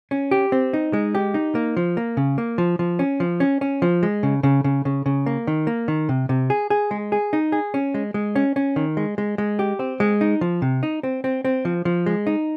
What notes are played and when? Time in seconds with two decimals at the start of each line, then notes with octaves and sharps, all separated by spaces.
0.11 C#4
0.31 G4
0.52 C4
0.73 D#4
0.93 G#3
1.15 G4
1.34 D#4
1.55 A#3
1.77 F3
1.97 A#3
2.17 C#3
2.38 A#3
2.58 F3
2.79 F3
2.99 C#4
3.20 F3
3.40 C#4
3.61 C#4
3.82 F3
4.03 G#3
4.23 C#3
4.43 C#3
4.64 C#3
4.85 C#3
5.06 C#3
5.26 A#3
5.47 D#3
5.67 A#3
5.88 D#3
6.09 C3
6.29 C3
6.50 G#4
6.70 G#4
6.91 G#3
7.12 G#4
7.33 D#4
7.52 G#4
7.74 C#4
7.94 G#3
8.14 G#3
8.36 C#4
8.56 C#4
8.76 D#3
8.97 G#3
9.18 G#3
9.38 G#3
9.59 G4
9.79 C4
10.00 G#3
10.21 D#4
10.41 F3
10.62 C3
10.83 D#4
11.03 C4
11.24 C4
11.45 C4
11.65 F3
11.85 F3
12.06 G#3
12.27 D#4